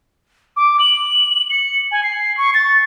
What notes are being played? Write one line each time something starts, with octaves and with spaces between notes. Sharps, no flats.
D6
F#7
C#7
G#5
C7
C#6
A6